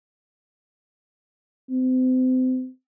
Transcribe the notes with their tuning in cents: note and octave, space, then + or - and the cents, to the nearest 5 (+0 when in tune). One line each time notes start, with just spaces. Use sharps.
C4 -35